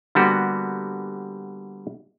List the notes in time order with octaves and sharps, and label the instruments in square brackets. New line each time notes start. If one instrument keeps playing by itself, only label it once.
[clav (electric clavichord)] D3 G3 A#3 B3 F#4 G4